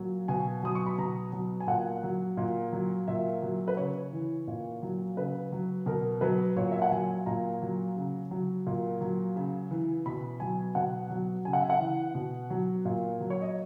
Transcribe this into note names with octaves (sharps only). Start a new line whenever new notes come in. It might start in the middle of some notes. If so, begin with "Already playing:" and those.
Already playing: A#2 F#3
B2 G#5
F#3 D#6
C#6
B5
B2 A#5
F#3
G#5
A#2 F#5
F#3
A#2
F#3
A#2 E5
F#3
B4
C#3 C#5
E3
A#2
F#3
C#3 B4
F#3
B2 A#4
F#3 B4
A#2 C#5
E5
F#5
F#3 G#5
A#2 A#5
F#3
C#3
F#3
A#2
F#3
C#3
E3
B2 B5
F#3 G#5
B2 F#5
F#3
C#3 G#5
F#5
E5
F#5
E3
B2
F#3
A#2
F#3
C#5
D#5